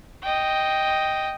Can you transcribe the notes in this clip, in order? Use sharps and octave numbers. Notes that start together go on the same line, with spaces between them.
D#5 G5